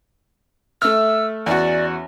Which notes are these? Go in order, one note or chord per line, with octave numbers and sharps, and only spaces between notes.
A3 E5 E6 F6
E2 C#4 F#4 D5